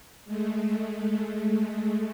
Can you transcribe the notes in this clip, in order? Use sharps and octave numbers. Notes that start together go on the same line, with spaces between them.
G#3 A3